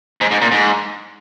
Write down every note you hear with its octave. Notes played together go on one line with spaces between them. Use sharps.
G#2
G#2
A#2
G#2